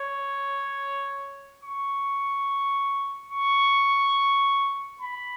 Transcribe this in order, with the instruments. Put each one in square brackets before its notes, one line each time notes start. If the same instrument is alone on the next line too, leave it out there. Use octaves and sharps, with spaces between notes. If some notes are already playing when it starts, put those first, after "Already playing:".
Already playing: [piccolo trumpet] C#5
C#6
C#6
B5